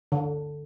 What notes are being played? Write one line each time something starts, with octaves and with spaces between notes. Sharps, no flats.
D3